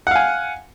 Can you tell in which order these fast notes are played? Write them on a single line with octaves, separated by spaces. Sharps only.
F#5 F5 G#5